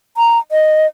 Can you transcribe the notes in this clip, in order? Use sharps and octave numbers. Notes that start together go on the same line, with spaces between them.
A#5
D#5